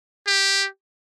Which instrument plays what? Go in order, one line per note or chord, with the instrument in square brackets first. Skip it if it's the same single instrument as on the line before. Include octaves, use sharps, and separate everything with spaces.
[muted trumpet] G4